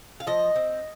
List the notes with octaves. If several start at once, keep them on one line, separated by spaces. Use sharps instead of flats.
F5
F3 D#5
C4